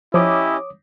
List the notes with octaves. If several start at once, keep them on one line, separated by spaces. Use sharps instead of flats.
F3 C#4 E4 G4 C#5 D#5 D6 D#6